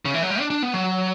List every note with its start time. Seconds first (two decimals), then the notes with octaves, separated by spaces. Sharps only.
0.05 C#3
0.14 E3
0.23 F#3
0.30 G3
0.40 D4
0.50 D4
0.63 B3
0.74 F#3